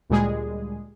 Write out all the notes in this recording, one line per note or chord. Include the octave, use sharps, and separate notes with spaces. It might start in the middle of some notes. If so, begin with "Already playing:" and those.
D2 A#2 G3 G#3 G#4